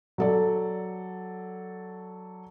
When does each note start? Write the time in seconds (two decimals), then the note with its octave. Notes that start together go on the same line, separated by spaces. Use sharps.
0.18 F#3 A4 D5